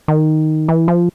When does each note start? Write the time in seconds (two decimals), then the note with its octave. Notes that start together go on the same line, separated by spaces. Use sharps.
0.08 D#3
0.68 E3
0.88 F3